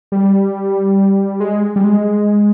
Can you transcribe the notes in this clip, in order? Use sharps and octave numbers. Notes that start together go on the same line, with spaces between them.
G3
G#3
G3
G#3